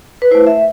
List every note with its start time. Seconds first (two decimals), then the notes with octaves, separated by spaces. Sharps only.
0.22 B4
0.31 A3 E4 C5
0.47 E5